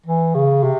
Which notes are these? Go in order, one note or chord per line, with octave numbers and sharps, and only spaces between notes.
E3
C#3
C3